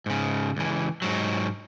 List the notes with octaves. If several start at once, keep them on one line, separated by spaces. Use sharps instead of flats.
G#2 C#3
C#2 E3
G#2 F#3